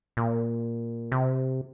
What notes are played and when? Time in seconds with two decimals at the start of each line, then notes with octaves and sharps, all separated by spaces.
0.17 A#2
1.12 C3